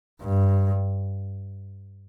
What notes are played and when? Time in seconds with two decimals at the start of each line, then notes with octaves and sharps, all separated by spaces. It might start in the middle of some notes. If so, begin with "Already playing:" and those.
0.22 G2